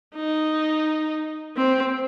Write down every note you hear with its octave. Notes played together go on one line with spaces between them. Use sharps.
D#4
C4